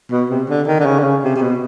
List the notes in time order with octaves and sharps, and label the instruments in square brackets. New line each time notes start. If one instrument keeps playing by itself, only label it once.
[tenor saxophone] B2
C3
D3
D#3
D3
C#3
D3
C#3
C3
C3
B2